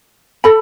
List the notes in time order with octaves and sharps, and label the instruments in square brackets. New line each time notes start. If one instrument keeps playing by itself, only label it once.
[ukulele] A4 B5